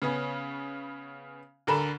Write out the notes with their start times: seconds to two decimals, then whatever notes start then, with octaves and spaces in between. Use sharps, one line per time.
0.02 C#3 B3 C#4
1.67 D2 D3 A#4 B5 E7